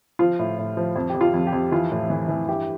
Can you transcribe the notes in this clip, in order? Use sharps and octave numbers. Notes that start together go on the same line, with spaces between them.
F3 F4
A2
A2
F3
F2
G4
F2
F4
F2
G4
F2
E3 F4
A2
E3
E3
G2 G4